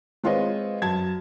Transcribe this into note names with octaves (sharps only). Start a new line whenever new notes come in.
G#3 C4 F4 B4 C#5 D#5
F#2 A5 G#6